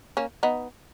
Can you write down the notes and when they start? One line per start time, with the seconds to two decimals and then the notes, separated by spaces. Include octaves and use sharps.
0.17 A#3 C#4
0.43 B3 D#4